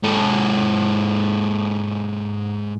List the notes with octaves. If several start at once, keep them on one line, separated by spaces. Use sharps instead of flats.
G#2 A4